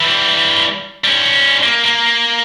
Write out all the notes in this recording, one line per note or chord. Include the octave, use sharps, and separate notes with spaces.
E3 G3
G3 C#4
A#3
A#3